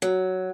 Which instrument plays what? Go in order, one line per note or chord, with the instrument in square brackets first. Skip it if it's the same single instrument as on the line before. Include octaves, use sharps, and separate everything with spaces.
[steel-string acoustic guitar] F#3